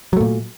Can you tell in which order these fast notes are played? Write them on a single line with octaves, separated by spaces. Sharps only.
F#3 A3 A#2